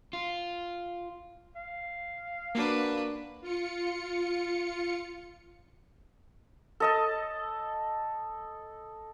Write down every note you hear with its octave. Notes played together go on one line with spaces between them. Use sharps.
F4
F5
A#3 D4 F#4 B4
F4 C#7
A4 D#5 A5